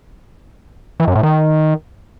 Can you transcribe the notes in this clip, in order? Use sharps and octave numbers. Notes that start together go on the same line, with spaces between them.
E3
F#2
A2
D#3